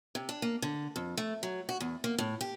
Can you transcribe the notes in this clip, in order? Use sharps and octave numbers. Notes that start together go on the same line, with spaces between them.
C3
D4
A#3
D3
F2
A3
F#3
F#4
E2
A#3
A2
G4